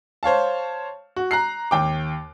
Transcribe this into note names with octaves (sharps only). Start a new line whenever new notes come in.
C5 C#5 F5 A5
F#4
A#5 F#6 C7
D#2 G5 D6